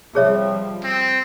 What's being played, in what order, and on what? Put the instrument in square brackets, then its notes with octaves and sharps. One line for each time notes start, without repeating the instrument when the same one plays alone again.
[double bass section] C3 F3 G3 [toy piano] G#4 C#5 E5
[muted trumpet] C4